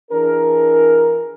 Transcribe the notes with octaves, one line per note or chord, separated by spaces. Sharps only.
E3 D4 G#4 A#4